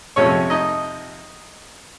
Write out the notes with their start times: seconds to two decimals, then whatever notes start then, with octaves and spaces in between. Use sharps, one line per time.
0.16 F2 C3 F3 G#3 C#4 C#5
0.50 D#4 D#5